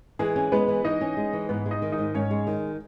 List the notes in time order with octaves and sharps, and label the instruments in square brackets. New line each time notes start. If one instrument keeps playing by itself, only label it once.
[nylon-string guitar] E3 [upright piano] G#3 G#4
[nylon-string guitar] C#4
[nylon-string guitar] G#3 [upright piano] B3 B4
[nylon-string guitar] E3
[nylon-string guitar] E3 [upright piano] D#4 D#5
[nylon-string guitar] C#4
G#3
E3
[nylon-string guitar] G#2 [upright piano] B3 B4
[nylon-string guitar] G#3
[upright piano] D#4 D#5
[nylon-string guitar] D#3
[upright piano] D#4 D#5
[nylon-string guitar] G#2
[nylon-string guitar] G#2 [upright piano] C#4 C#5
[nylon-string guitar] G#3
[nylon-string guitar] D#3 [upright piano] D#4